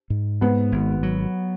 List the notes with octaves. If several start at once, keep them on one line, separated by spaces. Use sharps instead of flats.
G#2
G#2 B3
G#1
F#3